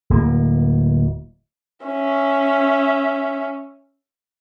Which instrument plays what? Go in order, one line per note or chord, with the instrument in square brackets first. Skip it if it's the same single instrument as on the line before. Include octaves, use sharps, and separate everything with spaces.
[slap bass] D1 A#3
[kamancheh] C#4 E5